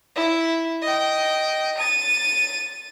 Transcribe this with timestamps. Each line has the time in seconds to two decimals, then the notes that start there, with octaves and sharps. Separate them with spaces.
0.16 E4
0.82 D#5 G5
1.78 A6 D#7